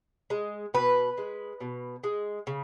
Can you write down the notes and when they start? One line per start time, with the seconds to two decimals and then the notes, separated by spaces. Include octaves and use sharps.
0.30 G#3
0.74 B2 B4
1.18 G#3
1.61 B2
2.04 G#3
2.47 C#3